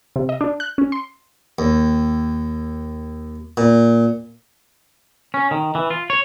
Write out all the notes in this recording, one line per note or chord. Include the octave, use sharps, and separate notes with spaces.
C3
D#5
D4
F#6
C#4
C6
D#2
A#2
C#4
D#3
E3
F4
C#5